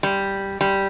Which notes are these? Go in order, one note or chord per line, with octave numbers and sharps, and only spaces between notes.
G3
G3